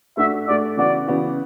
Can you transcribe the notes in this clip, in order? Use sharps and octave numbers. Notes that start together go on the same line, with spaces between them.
A3 D4 F#4 E5
A3 D4 F#4 D5
C#3 E3 B3 F#4 D5
C#3 E3 B3 F#4